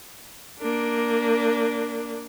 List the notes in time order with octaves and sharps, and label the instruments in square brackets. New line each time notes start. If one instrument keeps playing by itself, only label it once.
[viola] A#3 D4